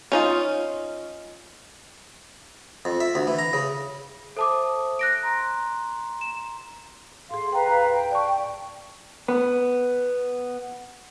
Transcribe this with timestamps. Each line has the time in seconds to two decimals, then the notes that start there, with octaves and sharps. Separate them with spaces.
0.12 C#4 D#4 F4
2.85 F2
3.00 E5
3.15 D2
3.27 E3
3.39 A#5
3.53 C#3
4.37 A4 C5 E5 A5 D6 D#6
4.99 F#6 A#6 D7
5.23 A#5 C6
6.21 E7
7.31 A2 G#4 F5 C6
7.53 B4 F5 G5 A#5
7.68 D#2
7.92 G5
8.11 D5 A5 C#6
9.28 B3 B4